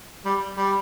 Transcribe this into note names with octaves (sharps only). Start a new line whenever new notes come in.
G3
G3